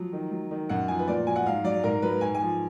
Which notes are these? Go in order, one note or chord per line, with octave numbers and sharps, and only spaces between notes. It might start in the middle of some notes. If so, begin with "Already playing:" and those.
Already playing: F3 F#3
D#3
F#3
D#3
F#2 F#5
F3 G#5
B4
A#2 D5
F#3 G#5
F#5
G#2 F5
F#3 D5
G#2 A#4
F#3 B4
G#2 G#5
G#5
F3